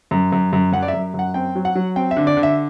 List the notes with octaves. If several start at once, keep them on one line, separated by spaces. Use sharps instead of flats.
F#2
F#2
F#2
F#2 F#5
D5
E5
F#2
F#2
F#5
C4 G5
F#3
F#5
F#3
C4 G5
E5
D3
D5
D3
E5